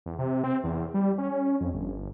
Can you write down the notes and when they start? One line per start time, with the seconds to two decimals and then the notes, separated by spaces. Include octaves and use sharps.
0.06 E2
0.19 C3
0.44 C4
0.64 E2
0.94 G3
1.18 C#4
1.60 F2
1.73 G1